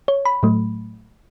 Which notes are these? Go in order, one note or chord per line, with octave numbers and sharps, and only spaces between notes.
C#5
B5
A2 F#3 A3